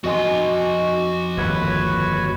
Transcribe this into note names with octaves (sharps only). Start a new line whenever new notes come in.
F2 F#4 D#5 G#5 C6
G1 D#2 B4 C#5